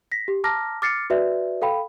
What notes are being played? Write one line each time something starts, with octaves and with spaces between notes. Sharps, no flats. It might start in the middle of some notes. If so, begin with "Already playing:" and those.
A#6 B6
G4
A5 A#5 D6 F6 A#6
D6 F6 A6 C7 C#7
F#4 B4 D5 E5
A4 F5 G5 B5